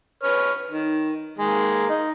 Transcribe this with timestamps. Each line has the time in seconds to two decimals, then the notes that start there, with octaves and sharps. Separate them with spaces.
0.23 B4 C#5 F6
0.71 D#3
1.38 D#3 G#3 A#3
1.89 D#4